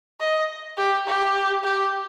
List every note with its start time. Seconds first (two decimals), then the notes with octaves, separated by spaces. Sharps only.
0.20 D#5
0.77 G4
1.07 G4
1.64 G4